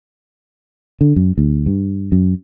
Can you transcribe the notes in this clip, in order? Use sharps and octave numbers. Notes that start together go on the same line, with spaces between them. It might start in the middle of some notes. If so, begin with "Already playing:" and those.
D3
F#2
D2
G2
F#2